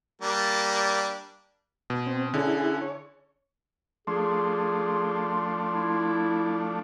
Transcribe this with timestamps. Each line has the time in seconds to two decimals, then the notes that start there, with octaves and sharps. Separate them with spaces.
0.21 G3 A#3 D4
1.90 B2
2.07 C4
2.34 D3 C#4 E4 G#4
2.82 C#5
4.07 F3 A3 D4 G#4 C6
5.74 E4